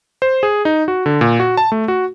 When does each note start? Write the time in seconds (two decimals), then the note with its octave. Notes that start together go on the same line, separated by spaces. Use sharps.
0.22 C5
0.43 G#4
0.65 D#4
0.88 F#4
1.06 D3
1.21 A#2
1.40 F#4
1.57 A5
1.72 A3
1.88 F#4